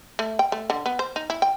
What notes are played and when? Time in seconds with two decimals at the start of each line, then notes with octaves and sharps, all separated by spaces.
0.19 A3
0.39 G5
0.52 A3
0.70 D3
0.86 B3
0.99 C5
1.16 D#4
1.30 E4
1.42 G5